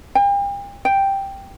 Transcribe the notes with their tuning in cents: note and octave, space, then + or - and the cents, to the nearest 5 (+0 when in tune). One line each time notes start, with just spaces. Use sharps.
G5 +40
G5 +0